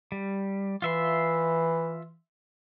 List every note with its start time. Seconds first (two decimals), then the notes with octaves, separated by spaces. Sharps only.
0.12 G3
0.82 E3 F4 E5 C6